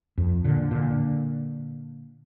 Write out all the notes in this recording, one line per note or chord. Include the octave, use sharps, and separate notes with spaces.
F2
A#2 D3
A#2 D3